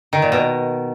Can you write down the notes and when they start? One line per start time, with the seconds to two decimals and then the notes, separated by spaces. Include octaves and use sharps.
0.13 D#3
0.22 A#2
0.32 B2